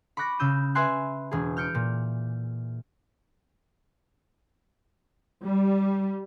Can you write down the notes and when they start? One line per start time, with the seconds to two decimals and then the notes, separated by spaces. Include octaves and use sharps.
0.17 B5 C#6 D6 F#6 A#6
0.39 C#3 E6 G6 D#7
0.75 B4 E5 G#5 C6 F#6
1.31 E1 G#4
1.57 F6 G6 C#7 D7
1.75 A#2
5.44 G3